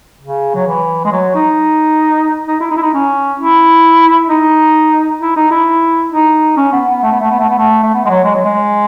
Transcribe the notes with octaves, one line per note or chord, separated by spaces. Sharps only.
C#3
F#3
E3
G#3
F#3
D#4
D#4
E4
D#4
E4
D#4
C#4
E4
D#4
E4
D#4
E4
D#4
C#4
B3
B3
A3
B3
A3
B3
A3
B3
A3
A3
B3
G#3
F#3
G#3
F#3
G#3